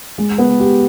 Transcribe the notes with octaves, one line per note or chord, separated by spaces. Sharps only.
G#3
B3
G4